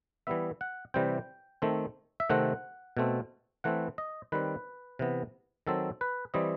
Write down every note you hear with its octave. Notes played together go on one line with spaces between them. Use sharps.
E3 G3 B3 E5
F#5
C3 E3 G3 C4 G5
D#3 A3 C4
E5
C3 D#3 A3 C4 F#5
B2 A3 C4
E3 A3 C4 F#5
D#5
D#3 G3 C4 B4
C3 E3 B3
D#3 F#3 C4 A4
B4
E3 G3 C4 D#5